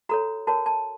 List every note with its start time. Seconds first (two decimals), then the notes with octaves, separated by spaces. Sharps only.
0.09 F#4 A4 C#5 A#5
0.47 F#4 A#4 C#5 A5
0.66 A5